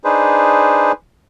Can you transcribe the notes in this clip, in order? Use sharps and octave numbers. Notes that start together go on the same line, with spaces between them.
D4 D#4 G#4 B4 C5